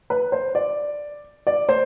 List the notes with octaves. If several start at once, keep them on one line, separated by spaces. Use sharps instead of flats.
B4
C5
D5
D5
C5